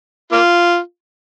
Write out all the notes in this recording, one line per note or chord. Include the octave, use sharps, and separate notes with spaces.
A#3 F4